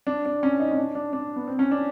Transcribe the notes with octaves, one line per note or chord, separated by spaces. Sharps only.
D4
D4
C#4
D#4
C#4
D4
D4
D4
B3
C4
C#4
D4